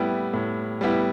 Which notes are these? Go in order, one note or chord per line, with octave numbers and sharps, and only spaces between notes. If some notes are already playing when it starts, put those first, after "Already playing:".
Already playing: A2 G3 B3 E4 G4
A2
G3 B3 E4 G4